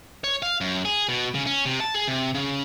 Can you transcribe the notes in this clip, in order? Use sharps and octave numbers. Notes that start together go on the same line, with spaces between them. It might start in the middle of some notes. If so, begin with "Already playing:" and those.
C#5
F5
F#2
G#4
B2
C#3
C#4
C3
A5
G#4
C3
C#3